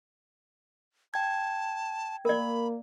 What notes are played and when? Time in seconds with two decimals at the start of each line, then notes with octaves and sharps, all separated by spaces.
1.14 G5 A5 G#6
2.25 A#3 A#4 D5 B5